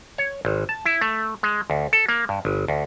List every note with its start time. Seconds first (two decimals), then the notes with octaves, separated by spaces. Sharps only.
0.18 C#5
0.45 G#1
0.69 A5
0.85 E4
1.01 A3
1.43 G#3
1.70 D2
1.93 A4
2.09 A#3
2.29 G2
2.45 G1
2.68 D2